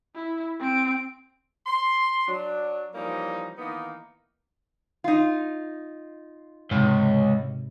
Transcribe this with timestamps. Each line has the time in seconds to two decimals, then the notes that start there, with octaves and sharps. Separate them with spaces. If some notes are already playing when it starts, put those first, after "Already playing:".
0.15 E4
0.60 C4 D7
1.67 C6
2.26 F#3 D4
2.95 E3 F3 G3 A#3 C#4 D#4
3.58 D#3 E3 A#3 B3 D#4
5.04 D#4 F4
6.71 C#2 G#2 C3